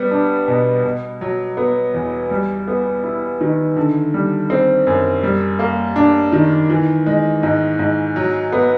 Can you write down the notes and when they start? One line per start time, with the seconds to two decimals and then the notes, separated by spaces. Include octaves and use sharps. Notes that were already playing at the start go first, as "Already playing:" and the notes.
Already playing: G3 B3
0.11 D4
0.48 B2
0.84 B2
1.21 F#3
1.57 B3
1.94 E2
2.31 G3
2.68 B3
3.04 E4
3.41 D#3
3.76 D3
4.14 G3
4.50 C4
4.87 F#2
5.23 G3
5.59 A#3
5.96 D4
6.32 D#3
6.70 E3
7.06 G#3
7.43 G#2
7.79 G#2
8.16 F#3
8.52 B3